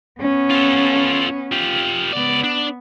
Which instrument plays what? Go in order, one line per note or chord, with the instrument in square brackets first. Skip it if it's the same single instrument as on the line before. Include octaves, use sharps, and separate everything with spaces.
[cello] B3 C#4
[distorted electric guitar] F4 A4
F4 G4
[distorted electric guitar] C#2 D5 [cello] B3
[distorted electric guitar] D4